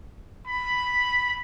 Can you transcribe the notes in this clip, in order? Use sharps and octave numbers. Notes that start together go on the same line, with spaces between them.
B5